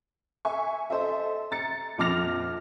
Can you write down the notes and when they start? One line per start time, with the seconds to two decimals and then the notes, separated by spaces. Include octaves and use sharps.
0.45 E5 G#5 C#6
0.90 A4 C5 D#5 E5
1.51 A#5 A6 C#7
1.98 A#1 F2 D6 F6 A#6 F7